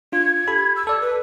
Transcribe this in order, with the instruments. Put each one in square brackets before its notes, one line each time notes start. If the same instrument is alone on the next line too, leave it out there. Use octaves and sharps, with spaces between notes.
[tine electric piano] D4 F4 [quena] G#6
[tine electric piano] G4 A4 B5
[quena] E6
[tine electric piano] A4 D5
[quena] B4